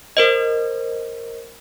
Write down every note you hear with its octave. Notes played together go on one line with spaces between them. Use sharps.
A#4 C5 D#5